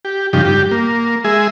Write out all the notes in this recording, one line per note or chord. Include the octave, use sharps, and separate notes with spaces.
G4
G2 C#3 F3 D#4 G4
G2 G4
A#3
G#3 G#4 E5